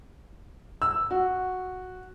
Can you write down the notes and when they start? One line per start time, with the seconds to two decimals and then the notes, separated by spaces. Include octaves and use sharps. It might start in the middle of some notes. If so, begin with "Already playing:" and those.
0.82 E6
1.11 F#4